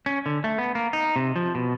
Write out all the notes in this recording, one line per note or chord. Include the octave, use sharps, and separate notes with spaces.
C#4
D3
A3
B3
A#3
D#4
C3
F3
B2